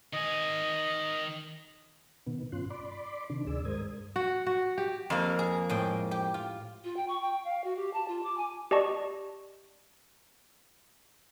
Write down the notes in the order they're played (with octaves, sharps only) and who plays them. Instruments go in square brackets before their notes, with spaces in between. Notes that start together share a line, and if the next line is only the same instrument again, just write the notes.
[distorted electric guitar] D#3 G#5 [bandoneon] D#5
[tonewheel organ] B2 D#3 B3
G2 C#4 F4 C6 F#6
D5 B5 C6 D6
C3 D#3 D4
D2 D#3 G#4 D5 E6
G2 G#3 A#4 C5 D#6 G#6
[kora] F#4
F#4
G4
[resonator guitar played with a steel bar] F2 A#3
[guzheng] G#4
A2 G#3 G5
G4
F4
[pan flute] F4
G5
C#6
G5
F5
F#4
G4
A5
F4
D6
G#5
[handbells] G4 D5 D#5 A5 C#6